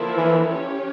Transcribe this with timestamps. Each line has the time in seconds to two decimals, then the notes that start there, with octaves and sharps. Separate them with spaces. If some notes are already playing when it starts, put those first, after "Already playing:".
Already playing: D3 F3 A#3 E4 A#4
0.17 E3
0.51 C#4 G4 C#5